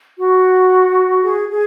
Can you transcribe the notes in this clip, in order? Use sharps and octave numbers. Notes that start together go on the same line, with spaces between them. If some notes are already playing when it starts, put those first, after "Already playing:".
F#4
G#4
G#4